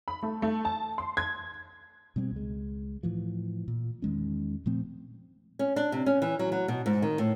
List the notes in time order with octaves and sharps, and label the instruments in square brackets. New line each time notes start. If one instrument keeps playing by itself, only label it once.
[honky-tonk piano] B5
A3
A3
A5
C6
G#6
[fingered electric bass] B2 G3 B3 C4
C#2 G#3
A2 E3 F3
A#2
E2 D#3 G#3 C#4
A#2 F3 A3 C4
[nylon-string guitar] C#4
D4
C3
C#4
E3
F#3
F#3
B2
G#2
D#3
A2